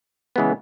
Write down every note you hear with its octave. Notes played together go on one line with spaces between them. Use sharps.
C#3 E3 G#3 B3